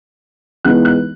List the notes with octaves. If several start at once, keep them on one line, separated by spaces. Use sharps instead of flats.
E3 G#3 B3 D#4 F#6
F#6